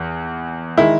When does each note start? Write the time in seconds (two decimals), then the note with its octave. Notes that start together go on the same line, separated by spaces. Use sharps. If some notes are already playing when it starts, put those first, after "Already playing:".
Already playing: E2 E3
0.77 D#3 G#3 E4